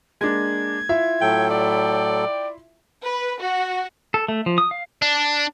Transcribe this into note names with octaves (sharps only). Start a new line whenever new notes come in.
G#3 A#3 D4 G#6
E4 F4 E5
A2 F#3 A4 G5
D5 G5
B4
F#4
A4
A3
F3
D#6
F5
D4